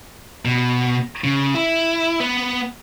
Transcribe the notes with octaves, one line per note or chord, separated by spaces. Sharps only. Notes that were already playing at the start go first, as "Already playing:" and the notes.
B2
C#3
E4
B3